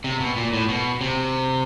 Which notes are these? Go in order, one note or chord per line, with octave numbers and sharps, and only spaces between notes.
C3
B2
A#2
A2
B2
C3